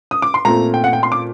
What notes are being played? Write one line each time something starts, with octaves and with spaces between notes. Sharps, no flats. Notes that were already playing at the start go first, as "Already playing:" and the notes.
D#6
D6
C6
A#2 A3 C4 A#5
G5
F#5
G5
C6
D6